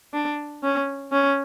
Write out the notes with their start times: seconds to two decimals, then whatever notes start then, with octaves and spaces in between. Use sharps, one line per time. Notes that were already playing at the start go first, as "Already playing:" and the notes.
0.13 D4
0.63 C#4
1.12 C#4